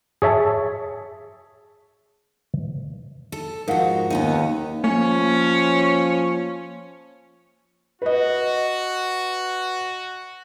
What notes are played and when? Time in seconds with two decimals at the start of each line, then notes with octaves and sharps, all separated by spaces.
0.22 G#4 C#5 E5 A5
3.32 A4
3.68 G#2 F3 D#4 F#4 A#4 F5 F#5
4.10 D#2 B3 C#4 D#4
4.84 F3 A#3 C#4
8.02 F#4 B4 D#5